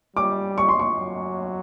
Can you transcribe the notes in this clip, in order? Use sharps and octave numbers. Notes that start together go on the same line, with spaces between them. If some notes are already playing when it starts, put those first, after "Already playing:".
G3 D6
C#6
C6
C#6
F#3